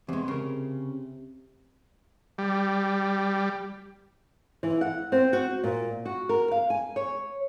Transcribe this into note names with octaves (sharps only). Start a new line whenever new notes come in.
E2 C3 G#3
C#3 A#4
G3
E3
F#5
C4
F#4
A#2
F#4
A#4
F5
G#5
C#5